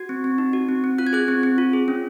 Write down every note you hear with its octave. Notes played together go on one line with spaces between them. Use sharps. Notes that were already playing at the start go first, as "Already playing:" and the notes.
Already playing: F#4 G#6
C4
C4
D#4
F#4
C4
C4
F4 F#6
G#6
G#4 F#6
C4
C4
F4
G#4
C#4